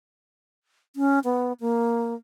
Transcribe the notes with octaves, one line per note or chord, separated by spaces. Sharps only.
C#4
B3
A#3